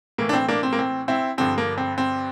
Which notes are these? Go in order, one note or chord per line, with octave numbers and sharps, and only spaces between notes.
A2 E3 A#3
D4
C4
A#3 D4
C4
A#3
C4
C4 E4
G2 D3 F3 C4
A#3
C4
C4